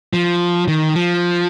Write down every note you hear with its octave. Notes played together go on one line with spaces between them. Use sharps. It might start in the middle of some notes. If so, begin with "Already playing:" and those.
F3
D#3
F3